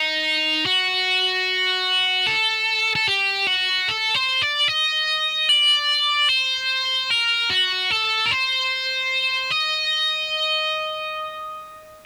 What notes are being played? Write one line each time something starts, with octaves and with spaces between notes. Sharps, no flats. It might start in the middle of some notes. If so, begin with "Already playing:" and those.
Already playing: D#4
F#4
A4
A4
G4
F#4
A4
C5
D5
D#5
D5
C5
A#4
F#4
A4
A#4
C5
D#5